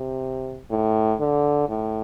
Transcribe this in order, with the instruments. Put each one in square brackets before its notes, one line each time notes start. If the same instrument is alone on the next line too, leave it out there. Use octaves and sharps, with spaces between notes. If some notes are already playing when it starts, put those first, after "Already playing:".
Already playing: [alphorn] C3
A2
D3
A2